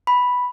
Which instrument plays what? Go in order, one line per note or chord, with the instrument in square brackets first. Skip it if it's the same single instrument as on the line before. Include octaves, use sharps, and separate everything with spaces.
[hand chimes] B5